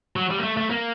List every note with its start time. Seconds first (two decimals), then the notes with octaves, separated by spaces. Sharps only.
0.16 F#3
0.31 G3
0.39 A#3
0.43 A3
0.57 A3
0.70 A#3